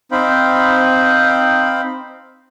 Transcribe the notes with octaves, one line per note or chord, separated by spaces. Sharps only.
C4 D#4 C5 F5 G5 B5